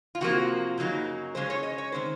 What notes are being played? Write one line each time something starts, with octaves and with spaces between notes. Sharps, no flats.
F4
C3 F3 A#3 F#4
F#2 C#3 F#3 A#3 D#4
C#3 G#3 C#4 C5
C#5
D#5
C#5
C3 D#3 C5